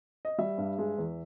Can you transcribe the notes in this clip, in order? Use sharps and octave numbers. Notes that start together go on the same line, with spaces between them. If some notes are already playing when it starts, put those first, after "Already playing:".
D#5
G3 E5
G2
G#3
E2